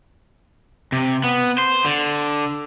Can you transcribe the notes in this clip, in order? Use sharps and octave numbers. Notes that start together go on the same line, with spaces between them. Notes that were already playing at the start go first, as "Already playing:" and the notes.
C3
B3
C5
D3